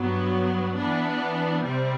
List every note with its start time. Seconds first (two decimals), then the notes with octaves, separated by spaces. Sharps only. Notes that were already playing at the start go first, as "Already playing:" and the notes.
Already playing: G2 F#3 B3
0.77 E3 B3 D4
1.63 C3 G3 C4